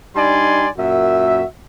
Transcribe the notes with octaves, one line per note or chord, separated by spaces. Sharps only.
G3 D4 D#4 D5 G#5 C6
F#2 A#2 F#4 E5